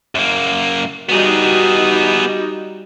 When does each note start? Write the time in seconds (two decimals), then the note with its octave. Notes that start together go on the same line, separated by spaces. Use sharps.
0.15 F#2 A#3
1.09 G3 B3 D#4 F#4 G#4